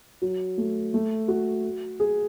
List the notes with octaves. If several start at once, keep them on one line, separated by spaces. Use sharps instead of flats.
F#3
A3
A3
F#4
G#4